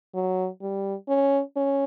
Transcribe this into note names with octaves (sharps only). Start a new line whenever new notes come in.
F#3
G3
C#4
C#4